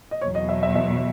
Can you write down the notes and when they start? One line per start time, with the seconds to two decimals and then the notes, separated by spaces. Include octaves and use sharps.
0.11 D#5
0.21 E2 B2 F#3 C#5
0.35 D#5
0.49 E5
0.63 E5
0.75 E5